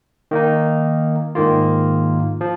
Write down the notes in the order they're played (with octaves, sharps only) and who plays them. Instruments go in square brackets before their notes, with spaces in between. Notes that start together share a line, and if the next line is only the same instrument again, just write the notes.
[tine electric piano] D#3 A#3 D#4
G#2 D#3 A#3 F4
F3